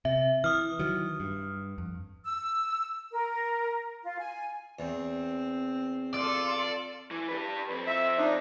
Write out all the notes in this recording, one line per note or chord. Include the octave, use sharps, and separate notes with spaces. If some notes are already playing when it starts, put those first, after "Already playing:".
C3 E5
E3 D#6 F6
D#3 E3 F#3
G2
F2
E6
A#4
F4
G#5
E2 C4
F4 A4 D5
E3
G4 B4
F2 C4
E5
D4 D#4